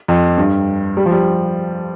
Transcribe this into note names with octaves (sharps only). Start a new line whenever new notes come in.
F2
G2
G3
F3
G3